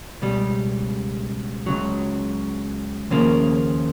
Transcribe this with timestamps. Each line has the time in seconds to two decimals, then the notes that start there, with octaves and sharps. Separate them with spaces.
0.22 C#2 B2 G3
1.66 C#2 C#3 F#3
3.10 D#2 C#3 F3 A#3